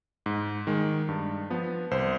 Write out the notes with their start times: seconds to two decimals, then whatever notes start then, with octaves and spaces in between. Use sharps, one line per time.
0.26 G#2
0.67 D#3 G#3
1.08 G2
1.50 F3 B3
1.91 C2 C5